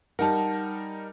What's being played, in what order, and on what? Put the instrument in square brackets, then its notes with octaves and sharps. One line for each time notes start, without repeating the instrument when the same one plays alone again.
[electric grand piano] G3 D#4 A#4 [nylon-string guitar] F#5 A5